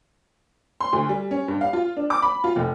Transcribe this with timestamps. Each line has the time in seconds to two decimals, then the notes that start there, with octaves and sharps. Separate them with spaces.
0.80 C6
0.93 D2
1.09 G3
1.31 C#4
1.48 G2
1.61 F5
1.73 F4
1.97 D4
2.10 D6
2.22 B5
2.44 F4
2.56 F1